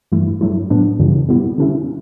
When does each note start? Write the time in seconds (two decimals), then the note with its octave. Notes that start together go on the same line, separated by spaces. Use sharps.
0.12 G2 E3 A3 E4
0.41 G2 F#3 A3 E4
0.70 A2 F#3 B3 D4
1.00 F#2 C#3 E3 G3
1.29 B2 G3 B3 E4
1.58 D3 G3 C#4 E4